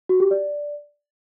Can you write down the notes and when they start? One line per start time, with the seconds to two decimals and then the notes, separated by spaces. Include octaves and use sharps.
0.09 F#4
0.20 G4
0.31 D5